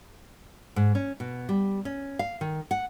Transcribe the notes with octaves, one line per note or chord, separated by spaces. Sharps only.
G#2
C#4
B2
G3
C#4
F5
D#3
F#5